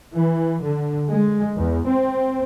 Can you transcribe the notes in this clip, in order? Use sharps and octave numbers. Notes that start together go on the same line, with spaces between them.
E3
D3
G#3
E2
C4